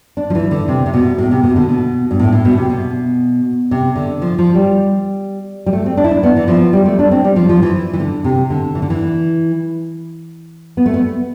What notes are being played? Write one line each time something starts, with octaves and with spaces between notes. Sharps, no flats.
D4
F3
E3
D3
C3
C3
B2
A2
C3
B2
D3
B2
G2
A2
A2
B2
C3
B2
C3
D3
F3
F3
G3
G3
A3
C4
D4
E4
D4
B3
E3
F3
G3
A3
D4
C4
G3
F3
F3
E3
E3
D3
C3
D3
E3
D3
E3
B3
A3
B3